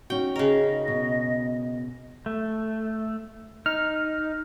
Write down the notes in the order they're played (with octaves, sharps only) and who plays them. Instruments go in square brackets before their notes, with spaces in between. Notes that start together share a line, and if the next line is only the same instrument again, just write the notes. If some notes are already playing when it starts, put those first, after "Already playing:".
[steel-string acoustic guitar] C#4 D#4 F#4 [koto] G5
[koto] C#3 A#4 [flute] D#5
[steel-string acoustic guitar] B2
[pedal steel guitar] A3
[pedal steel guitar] D#4 [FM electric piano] F6